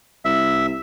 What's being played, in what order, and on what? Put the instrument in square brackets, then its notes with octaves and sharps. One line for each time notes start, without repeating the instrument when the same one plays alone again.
[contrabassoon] C2 [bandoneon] E5